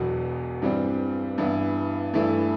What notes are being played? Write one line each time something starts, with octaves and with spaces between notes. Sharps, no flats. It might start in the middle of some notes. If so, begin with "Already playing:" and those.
Already playing: E1 E2 B2 F#3 B3
G2 E3 G3 C4
G2 E3 B3 E4
G2 E3 A3 E4